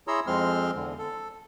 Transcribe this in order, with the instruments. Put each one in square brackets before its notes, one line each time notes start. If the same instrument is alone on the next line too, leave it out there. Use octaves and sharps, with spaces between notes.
[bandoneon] E4 G#4 C#5 A#5 C6 E6
F2 F3 G#3 C4 C6 F6
E2 D3
A4